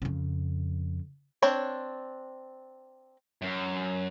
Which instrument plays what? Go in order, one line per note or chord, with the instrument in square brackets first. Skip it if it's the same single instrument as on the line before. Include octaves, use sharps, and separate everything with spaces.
[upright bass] F2 C#3
[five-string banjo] C4 D4 C#5
[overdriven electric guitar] F#2